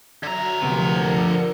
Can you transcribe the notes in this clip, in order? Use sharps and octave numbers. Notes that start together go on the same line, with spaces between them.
D3 F#3 E5 A#5 G#6
D2 C3 F3 B3 A#4 C#7